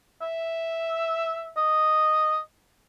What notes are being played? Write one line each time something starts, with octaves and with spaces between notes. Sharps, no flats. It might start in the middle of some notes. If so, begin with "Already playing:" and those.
E5
D#5